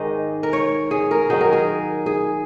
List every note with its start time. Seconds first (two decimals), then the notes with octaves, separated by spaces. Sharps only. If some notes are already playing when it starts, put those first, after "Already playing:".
Already playing: G#2 D#3 G#3 D#4 D#5
0.43 A#4
0.53 C#5
0.91 G#4
1.11 A#4
1.30 D#3 F#3 D#4 G#4
1.41 A#4
1.53 G#4
2.06 G#4